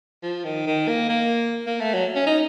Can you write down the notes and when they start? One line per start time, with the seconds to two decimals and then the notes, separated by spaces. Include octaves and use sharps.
0.23 F3
0.45 D#3
0.67 D#3
0.88 A#3
1.09 A#3
1.66 A#3
1.80 A3
1.94 F#3
2.15 C#4
2.27 D#4